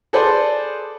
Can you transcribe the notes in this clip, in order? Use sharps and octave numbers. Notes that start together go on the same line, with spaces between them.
G#4 A4 B4 C5 D5